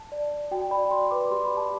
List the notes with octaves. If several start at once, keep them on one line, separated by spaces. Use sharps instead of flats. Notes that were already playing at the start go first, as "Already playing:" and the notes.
Already playing: A5
D5
D5
F#4 G5
D5 B5
D5 C6
B4 D6
G4 C6
B5
D5
A5